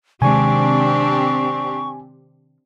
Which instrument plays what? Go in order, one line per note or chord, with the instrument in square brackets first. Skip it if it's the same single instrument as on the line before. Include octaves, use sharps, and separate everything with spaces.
[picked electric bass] C3 D#3 G#3 [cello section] C4 D4 G4 [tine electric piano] G#5 [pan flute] C#6